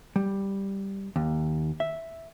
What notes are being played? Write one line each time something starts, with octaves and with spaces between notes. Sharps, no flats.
G3
D#2
E5